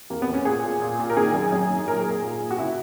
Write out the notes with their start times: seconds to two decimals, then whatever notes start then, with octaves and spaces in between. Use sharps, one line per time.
0.10 E2 A#3
0.22 B3
0.28 E2
0.34 C#4
0.45 A#2 G#4
0.63 A#2
0.82 A#2
0.99 A#2
1.10 A#4
1.17 D#3 G#4
1.34 F#2
1.52 F#2
1.70 D#3
1.88 A#2 A#4
2.00 G#4
2.06 A#2
2.11 G#4
2.23 A#2
2.41 A#2
2.51 F#4
2.58 C#3 E4